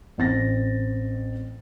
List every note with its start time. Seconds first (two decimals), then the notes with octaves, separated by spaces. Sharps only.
0.18 A1 C4 A6 A#6